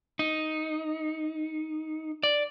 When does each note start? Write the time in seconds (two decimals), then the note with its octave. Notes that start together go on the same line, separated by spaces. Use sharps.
0.19 D#4
2.23 D5